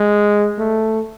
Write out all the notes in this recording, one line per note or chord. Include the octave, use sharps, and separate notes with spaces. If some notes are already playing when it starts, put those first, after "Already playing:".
Already playing: G#3
A3